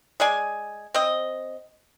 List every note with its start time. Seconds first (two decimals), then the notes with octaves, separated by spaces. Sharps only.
0.20 G#3 D5 G#5
0.94 C4 D#5